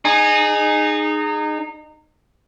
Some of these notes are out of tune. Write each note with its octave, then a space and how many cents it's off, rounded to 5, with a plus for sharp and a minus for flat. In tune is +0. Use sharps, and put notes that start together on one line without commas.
D#4 -25 G#4 +0